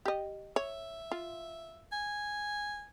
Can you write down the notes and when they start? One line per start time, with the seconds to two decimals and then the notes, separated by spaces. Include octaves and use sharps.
0.05 G4 D#5
0.56 C#5 E5
1.11 F4
1.92 G#5